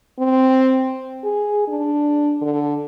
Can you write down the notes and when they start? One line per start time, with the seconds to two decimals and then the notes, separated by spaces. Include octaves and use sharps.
0.19 C4
1.24 G#4
1.68 D4
2.41 D3